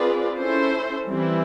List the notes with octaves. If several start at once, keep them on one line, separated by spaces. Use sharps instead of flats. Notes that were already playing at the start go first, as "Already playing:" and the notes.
Already playing: C4 F4 G#4 B4 D5
C#4 E4 A4 C5
E3 G3 C4 E4